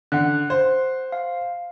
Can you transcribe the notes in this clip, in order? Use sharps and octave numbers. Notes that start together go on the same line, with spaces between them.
D3 F#5 F#6
C5
F5